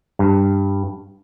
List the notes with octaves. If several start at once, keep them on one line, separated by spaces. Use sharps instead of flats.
G2